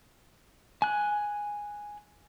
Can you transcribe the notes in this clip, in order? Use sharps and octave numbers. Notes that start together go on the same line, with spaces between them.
G#5 F#6